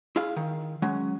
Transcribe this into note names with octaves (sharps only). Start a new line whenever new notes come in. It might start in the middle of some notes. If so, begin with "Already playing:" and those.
E4 G#4 F5
D#3
F#3 G#3 C#4